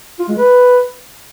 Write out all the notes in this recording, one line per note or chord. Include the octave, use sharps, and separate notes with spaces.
F4
G#3
B4